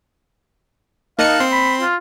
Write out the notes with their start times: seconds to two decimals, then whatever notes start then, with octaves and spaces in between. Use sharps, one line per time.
1.19 A#3 D#4 D#5 F5 A5 F#6 C#7
1.40 C4 C6
1.52 B5
1.81 F4